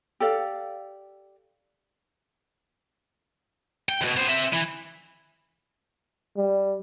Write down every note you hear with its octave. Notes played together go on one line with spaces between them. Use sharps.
G4 A4 D5 F5
G5
D#2 B2
B3 C5
C4 E5
E3
G3